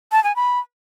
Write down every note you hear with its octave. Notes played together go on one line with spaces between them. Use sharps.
A5
G#5
B5